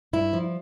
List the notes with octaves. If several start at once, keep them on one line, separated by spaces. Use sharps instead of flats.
G2 E4
F3